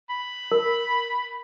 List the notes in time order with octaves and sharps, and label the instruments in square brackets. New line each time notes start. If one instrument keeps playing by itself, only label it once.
[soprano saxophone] B5
[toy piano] A#4